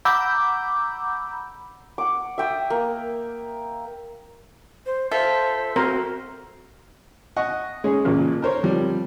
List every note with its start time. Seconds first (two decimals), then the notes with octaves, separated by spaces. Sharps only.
0.05 F#5 A#5 B5 D6 E6 G6
1.98 F#5 D6
2.38 E5 G5 D#6
2.70 A#3
4.86 C5
5.11 F4 A4 C5 E5
5.76 C4 F#4 A#4 C5
7.37 D#5 F#5 C#6
7.84 G#3 C#4 G#4
8.05 A1 A#2 C#3
8.42 A#4 C5 C#5
8.63 F2 F3 G3